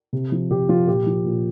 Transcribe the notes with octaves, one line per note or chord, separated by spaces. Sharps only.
C3
F3
C3 G4
F3 F4
A#2 G4
F3
A#2